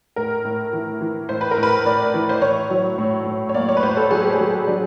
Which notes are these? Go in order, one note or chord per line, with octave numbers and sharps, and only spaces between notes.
A2 A#4
A2
E3
E3
A2 C5
B4
A#4
A2
B4
A2 D5
E3
C5
A2 C#5
F#3
A2
A2
C#5
A#3 D5
C#5
B4
A2 C5
A4
F#3 G#4
G4
G#4
F#3
F#3 D4